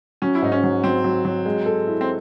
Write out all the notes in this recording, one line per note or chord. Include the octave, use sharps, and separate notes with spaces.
F#3 C#4
E4
G#2 D#4
C#4
F#3
F#3 C4
F#3
F#3
G#3
A4
E4
C4